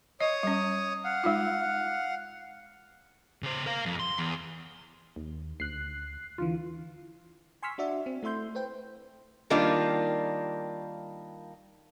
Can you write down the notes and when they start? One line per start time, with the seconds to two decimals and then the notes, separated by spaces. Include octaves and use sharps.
0.21 C#5 D#5 D#6
0.43 G3 C#4
1.04 F5 F#5
1.24 G#3 D#4 F4
3.43 C#3 C5
3.66 A#4 F5
3.86 F2
4.00 C6
4.19 E2
5.16 D#2
5.60 D2 F#6 C7
6.38 D#2 D3 E3 F4
7.63 G#5 C6 C#6 E6 F6 B6
7.78 D4 F#4 D5 E5
8.06 C4
8.23 A3 E4 E5 C6 G6
8.55 B4 C5 G5
9.50 D#3 G3 A#3 D4 F4